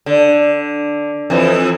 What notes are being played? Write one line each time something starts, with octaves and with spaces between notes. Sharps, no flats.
D3
F2 E3